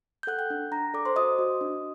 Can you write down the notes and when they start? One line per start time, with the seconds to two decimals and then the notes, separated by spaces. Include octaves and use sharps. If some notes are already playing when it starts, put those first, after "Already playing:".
0.23 G6
0.27 A4 F#5 F#6
0.38 G5 G6
0.50 D4
0.72 D4 A#5 A#6
0.94 A4 D5 D6
1.05 C5 C6
1.16 F#4 D#5 D#6
1.39 F#4
1.61 D4